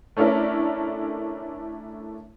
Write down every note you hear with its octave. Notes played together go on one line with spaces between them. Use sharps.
A3 C#4 D4 E4 A#4